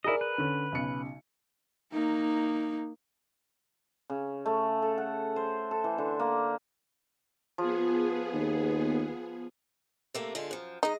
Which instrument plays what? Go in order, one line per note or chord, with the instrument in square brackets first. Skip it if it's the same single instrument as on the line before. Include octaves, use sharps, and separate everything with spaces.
[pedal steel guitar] E4 D#5 [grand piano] G#4 A#4 D5
[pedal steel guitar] B4
[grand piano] D3 C#4
B1 C#3 C#7
[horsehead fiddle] A#3 D#4
[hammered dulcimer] C#3
A3
A4
F#5
C5
A4
E3
D3
A#3
[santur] F3 [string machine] B3 G#4
[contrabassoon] D#2
[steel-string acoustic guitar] C3 A3 A#3
D3 G#3 F4
F#2 F3
[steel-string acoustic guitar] G#3 D#5 [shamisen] D#4